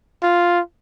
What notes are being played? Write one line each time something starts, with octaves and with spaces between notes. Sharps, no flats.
F4